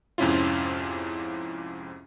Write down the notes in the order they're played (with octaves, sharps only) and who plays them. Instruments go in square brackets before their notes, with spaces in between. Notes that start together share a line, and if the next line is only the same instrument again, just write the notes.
[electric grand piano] F2 G#2 C3 C#4 E4 F4